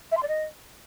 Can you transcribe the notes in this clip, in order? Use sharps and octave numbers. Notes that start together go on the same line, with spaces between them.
E5
C6
D5
D#5